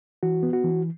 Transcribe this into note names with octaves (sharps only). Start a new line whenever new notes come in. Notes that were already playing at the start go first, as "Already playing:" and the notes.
E3 F#4
B3
F#4
E3